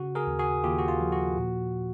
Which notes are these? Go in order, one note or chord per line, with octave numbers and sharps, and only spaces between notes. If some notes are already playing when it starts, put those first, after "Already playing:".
Already playing: C#3 F#4
G#4 A#4
D#2
F#4 G#4
D#2 F4 G4
F#4
F4
F3
F#4
A#2